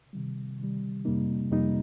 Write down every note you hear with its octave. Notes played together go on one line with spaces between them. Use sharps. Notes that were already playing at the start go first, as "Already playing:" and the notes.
C3 D#3 G3
C3 D#3 G3
F2 C3 G3 A#3 D#4
F2 C3 G3 A#3 D#4